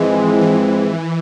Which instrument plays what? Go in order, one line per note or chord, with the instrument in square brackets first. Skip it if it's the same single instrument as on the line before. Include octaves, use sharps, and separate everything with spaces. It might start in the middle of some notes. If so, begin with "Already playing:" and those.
Already playing: [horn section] G#2 F3 G#3 C4 [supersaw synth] E3
[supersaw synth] E3